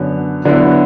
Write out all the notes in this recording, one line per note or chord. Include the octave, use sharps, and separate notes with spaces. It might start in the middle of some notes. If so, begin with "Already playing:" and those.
Already playing: F#2 D3 B3
D3 F#3 B3 E4